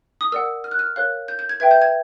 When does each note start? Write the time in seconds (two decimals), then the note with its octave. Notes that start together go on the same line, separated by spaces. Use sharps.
0.21 D#6
0.32 A#4 D5 F#5 E6
0.64 F6
0.71 F#6
0.79 F6
0.96 A#4 C#5 F5 F#6
1.28 G6
1.39 G6
1.49 G#6
1.60 B4 E5 G5 G#6
1.71 G6
1.82 G#6